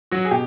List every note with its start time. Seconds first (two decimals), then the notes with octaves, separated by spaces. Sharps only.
0.12 F#3 F#4
0.25 G#4
0.31 B2 G4